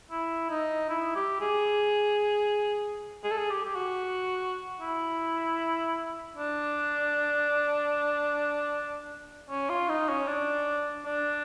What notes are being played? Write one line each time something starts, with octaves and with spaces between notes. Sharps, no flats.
E4
D#4
E4
G4
G#4
G#4
A4
G#4
G4
G4
F#4
E4
D4
C#4
F4
D#4
C#4
D4
D4